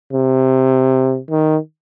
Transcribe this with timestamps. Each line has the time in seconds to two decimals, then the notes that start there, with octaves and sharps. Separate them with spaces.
0.13 C3
1.30 D#3